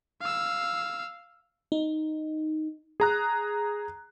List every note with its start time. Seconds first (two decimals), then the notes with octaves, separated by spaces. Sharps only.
0.21 F5 E6
1.72 D#4
3.00 G#4 A#5 F#6